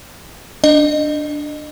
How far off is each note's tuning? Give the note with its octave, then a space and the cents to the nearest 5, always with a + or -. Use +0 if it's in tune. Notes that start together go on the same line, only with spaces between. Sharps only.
D4 +0 D#5 -30